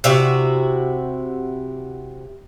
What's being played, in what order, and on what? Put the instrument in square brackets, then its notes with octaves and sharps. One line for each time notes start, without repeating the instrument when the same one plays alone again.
[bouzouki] C3 E4 F#4